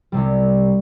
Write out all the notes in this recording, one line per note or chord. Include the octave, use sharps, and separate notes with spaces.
C2 C3 G3